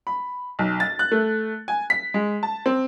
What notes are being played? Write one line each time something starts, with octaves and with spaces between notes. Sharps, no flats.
B5
B1
A6
F#6
A3
G#5
B6
G#3
A5
C4